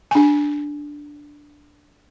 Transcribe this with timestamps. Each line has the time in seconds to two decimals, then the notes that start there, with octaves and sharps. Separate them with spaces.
0.11 D4 G#5